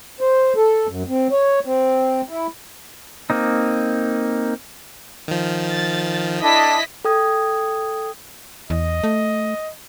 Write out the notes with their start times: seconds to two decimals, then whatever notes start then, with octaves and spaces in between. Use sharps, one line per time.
0.21 C5
0.56 A4
0.87 F#2
1.08 C4
1.31 C#5
1.65 C4
2.29 E4
3.30 A#3 C4 D#4
5.28 D#3 F3
5.62 A6
6.40 D4 E4 A4 D#5 B6
7.05 A4 G5 D#6 G#6
8.70 E2 D#5
9.04 A3